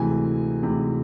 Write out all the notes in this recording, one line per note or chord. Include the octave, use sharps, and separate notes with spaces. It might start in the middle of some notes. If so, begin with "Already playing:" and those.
Already playing: D2 C3 E3 G#3 G#5
D2 C3 E3 G#3